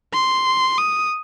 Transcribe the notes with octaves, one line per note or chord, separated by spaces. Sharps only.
C6
D#6